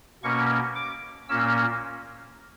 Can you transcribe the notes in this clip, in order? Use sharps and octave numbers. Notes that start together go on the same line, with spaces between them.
B2 A#3 C#4 C#6
D6
A#2 A#3 C#4 E6